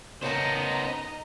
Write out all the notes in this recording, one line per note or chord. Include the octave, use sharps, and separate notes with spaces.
C#3 B3 D#4 A#4 C5 D#5 A5 A#5